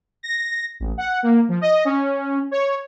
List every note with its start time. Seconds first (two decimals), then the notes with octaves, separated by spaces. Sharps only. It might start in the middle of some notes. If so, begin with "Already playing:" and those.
0.23 A#6
0.80 A1
0.98 F#5
1.23 A#3
1.49 F3
1.61 D#5
1.85 C#4
2.51 C#5